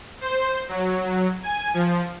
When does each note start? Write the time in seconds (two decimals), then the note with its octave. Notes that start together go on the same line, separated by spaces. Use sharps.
0.21 C5
0.69 F#3
1.43 G#5
1.74 F3